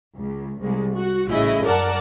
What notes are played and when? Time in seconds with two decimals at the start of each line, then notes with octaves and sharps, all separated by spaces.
0.18 C#2
0.62 C2 G#3
0.94 F#4
1.28 A1 C#3 E4 D#5
1.64 F#2 A#4 D5 F#5 A5